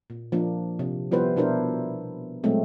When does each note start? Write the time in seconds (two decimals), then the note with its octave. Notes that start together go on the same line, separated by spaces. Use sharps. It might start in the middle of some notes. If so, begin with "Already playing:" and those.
0.10 A#2
0.32 F3 A#3 D4
0.79 C3
1.12 F3 G3 B3 E4 B4 C5
1.36 B2 D4 E4 A#4 C5
2.44 A#2 F#3 G#3 A3 C4